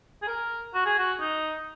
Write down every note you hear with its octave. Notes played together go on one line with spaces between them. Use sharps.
G#4
A#4
F#4
G#4
F#4
D#4